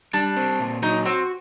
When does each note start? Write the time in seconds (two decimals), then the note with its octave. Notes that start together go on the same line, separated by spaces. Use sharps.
0.13 G3 D4
0.36 C4
0.60 A#2
0.82 F#3 D#4
1.05 C4 F#4